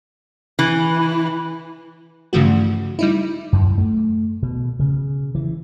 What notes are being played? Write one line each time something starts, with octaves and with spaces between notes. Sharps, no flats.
E3
G2 C#3 E3 F3 A3 F#4
G3 D#4 E4
F#2
A3
B2
C#3
E3